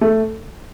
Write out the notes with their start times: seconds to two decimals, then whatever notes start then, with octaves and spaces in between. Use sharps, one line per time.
0.01 A3